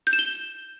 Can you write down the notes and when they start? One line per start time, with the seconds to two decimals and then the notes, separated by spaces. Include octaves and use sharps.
0.07 G6
0.13 E7
0.19 G7